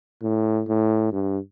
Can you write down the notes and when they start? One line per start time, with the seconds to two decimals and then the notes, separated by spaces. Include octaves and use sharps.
0.22 A2
0.68 A2
1.12 G2